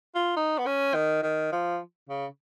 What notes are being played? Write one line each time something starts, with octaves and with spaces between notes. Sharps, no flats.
F4
D#4
B3
C#4
D#3
D#3
F3
C#3